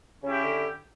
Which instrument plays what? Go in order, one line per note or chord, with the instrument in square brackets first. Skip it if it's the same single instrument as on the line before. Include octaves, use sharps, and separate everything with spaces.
[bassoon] C#3 [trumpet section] C#4 E4 G4
[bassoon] D3